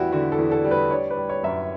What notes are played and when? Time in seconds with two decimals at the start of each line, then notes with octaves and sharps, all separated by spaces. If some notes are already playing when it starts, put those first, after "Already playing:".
Already playing: E2 G3 E4 F#4 G4
0.12 D3 F#4
0.32 A4
0.38 E2
0.52 A4
0.64 G3
0.71 B4
0.91 D4 C#5
1.11 B4
1.17 G3
1.29 C#5
1.43 F#2 E5
1.50 D5